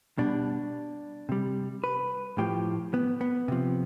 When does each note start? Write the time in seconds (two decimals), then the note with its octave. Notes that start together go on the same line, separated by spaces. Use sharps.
0.18 B2 G3 D4
1.29 C3 G3
1.84 B4
2.38 A2 F3 G4
2.94 B3
3.21 B3
3.48 C3 F3